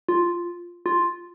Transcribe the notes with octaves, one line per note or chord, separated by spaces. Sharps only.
F4
F4